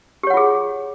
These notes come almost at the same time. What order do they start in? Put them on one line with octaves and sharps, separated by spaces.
G4 C#5 F#5 F4 G#4